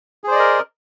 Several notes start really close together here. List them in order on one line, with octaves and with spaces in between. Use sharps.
G#4 C5 D5 D#5 A#4